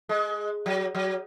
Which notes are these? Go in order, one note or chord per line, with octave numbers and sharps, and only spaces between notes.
G#3
F#3
F#3